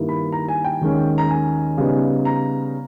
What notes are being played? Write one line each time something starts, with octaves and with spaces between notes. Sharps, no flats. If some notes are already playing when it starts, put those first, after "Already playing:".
Already playing: G2 D#3 G3 A#3 E4
B5
A#5
G#5
G5
D#2 D#3 G#3 C#4
A#5
G#5
C#3 G3 B3 D#4
A#5